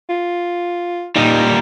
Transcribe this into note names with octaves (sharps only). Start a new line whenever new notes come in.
F4
A#2 G3 D#4